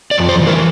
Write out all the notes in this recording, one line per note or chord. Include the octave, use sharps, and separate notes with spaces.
D5
F2
C5
E3 A#4